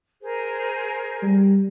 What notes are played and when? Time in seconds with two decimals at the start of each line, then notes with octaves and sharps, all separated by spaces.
0.21 G#4 A#4 C5
1.22 G3